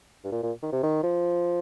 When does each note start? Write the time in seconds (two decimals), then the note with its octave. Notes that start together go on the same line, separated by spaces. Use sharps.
0.24 G2
0.32 A#2
0.43 A#2
0.63 D#3
0.72 C3
0.83 D#3
1.03 F3